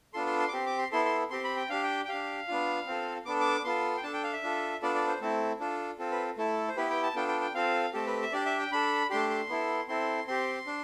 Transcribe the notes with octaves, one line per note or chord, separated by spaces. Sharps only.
B3 D4 F4 A4 C6
C6
C6
D6
C4 G4 C6
D6
C6
B3 E4 A4 C6
C6
C4 G4 C6
B5
G5
D4 G4 F5
G5
G5
D4 G4 F5
B3 D4 F4
C4 F4 A4
B3 D4 A4 D6
D6
B3 F4 A4 C6
G5
D4 A4 A5
G5
F5
E5
D4 F4 A4
B3 D4 F4 A4 D5
D5
C5
A3 C4 E4 A4
D4 F4 A4
C4 F4 A4
B4
A3 E4 A4
C5
B3 E4 G4 B4
G5
A5
B3 D4 F4 A4 G5
G5
G5
C4 F4 A4 F5
A3 C4 G4 A4
B4
E5
D4 G4 D5
E5
G5
D4 A4 B5
A3 D4 G4 C6
C6
B3 E4 A4
C4 E4 A4 C6
C4 G4 C6
D4